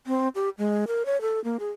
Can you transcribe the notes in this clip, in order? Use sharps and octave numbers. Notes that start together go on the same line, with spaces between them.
C4
G4
G#3
A#4
C#5
A4
A#3
G#4